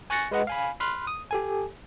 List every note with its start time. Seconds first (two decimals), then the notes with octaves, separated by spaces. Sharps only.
0.10 G#5 C#6 F#6 A6 A#6 C#7
0.31 G#3 B4 D#5 F#5
0.47 F5 G#5 B5
0.80 B5 C6 F6 F#6
1.07 D#6
1.31 G4 A4 G#5